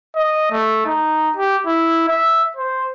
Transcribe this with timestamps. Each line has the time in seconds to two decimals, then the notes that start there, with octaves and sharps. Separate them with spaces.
0.16 D#5
0.51 A3
0.86 D#4
1.37 G4
1.66 E4
2.08 E5
2.57 C5